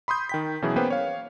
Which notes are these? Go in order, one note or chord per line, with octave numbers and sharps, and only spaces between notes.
B5 C6 D#6 G6
D#3 G5 B6
B2 E3 F#3 C#4 E4 G#4
A#3 B3 C#4 B4 C5 G5
C#5 F5